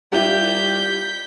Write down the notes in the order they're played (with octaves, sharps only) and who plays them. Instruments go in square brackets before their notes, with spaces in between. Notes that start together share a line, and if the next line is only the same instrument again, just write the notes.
[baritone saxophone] G3 [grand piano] E4 F4 G4 [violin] G6 B6